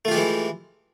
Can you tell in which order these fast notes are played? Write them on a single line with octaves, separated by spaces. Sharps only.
A3 F4 G4 G#3 E3